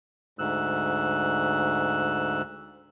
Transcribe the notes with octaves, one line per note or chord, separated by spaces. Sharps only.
D2 G#2 E6 F#6